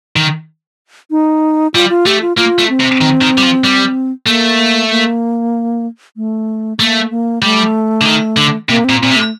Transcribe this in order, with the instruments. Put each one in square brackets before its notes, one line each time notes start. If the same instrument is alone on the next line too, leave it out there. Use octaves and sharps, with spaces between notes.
[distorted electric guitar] D#3
[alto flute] D#4
[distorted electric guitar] G3 [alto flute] F4
[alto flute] F4
[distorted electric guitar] A3 [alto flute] G4
[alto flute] F4
[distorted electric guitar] A#3 [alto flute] F4
[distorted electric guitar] A3
[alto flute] C4
[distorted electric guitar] C3
D#3
D#3
G3
F3
G3
[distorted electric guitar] A3 [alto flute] A#3
[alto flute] A#3
A3
[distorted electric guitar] A3 [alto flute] A#3
[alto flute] A#3
[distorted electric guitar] G3 [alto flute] A3
[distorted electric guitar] D3
D#3
D3
[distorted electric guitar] C3 [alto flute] A#3
[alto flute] C4
[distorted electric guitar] A#2
[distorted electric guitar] A#2 [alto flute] C4
[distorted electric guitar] C3
[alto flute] A3